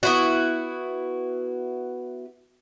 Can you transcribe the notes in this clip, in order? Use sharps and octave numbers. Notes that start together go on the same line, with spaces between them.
B3 E4 F#4